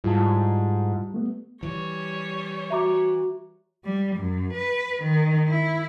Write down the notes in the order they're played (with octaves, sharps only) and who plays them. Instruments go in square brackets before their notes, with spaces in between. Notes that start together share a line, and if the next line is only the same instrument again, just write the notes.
[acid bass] G#2 [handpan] G3 [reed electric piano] E4 F4 A5
[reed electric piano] A3 B3
[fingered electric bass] E3 [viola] G3 C#5
[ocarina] F#4 [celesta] E5 A#5 D6
[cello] G3
F#2
B4
D#3
E4